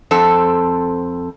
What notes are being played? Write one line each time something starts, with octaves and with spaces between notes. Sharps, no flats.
F2 C4 A4